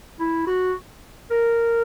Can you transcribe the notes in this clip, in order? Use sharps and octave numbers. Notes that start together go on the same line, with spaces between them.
E4
F#4
A#4